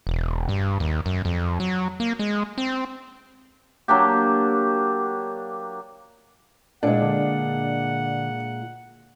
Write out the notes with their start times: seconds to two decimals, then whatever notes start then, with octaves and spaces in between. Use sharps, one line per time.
0.07 E1
0.49 G2
0.80 D#2
1.06 F#2
1.25 F2
1.60 F#3
2.00 A#3
2.19 G#3
2.58 C4
3.88 F#3 A#3 D4 G4
6.83 A#2 G#3 D4 F#5
7.02 D3